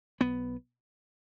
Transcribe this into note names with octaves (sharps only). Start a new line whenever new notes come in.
B1 B3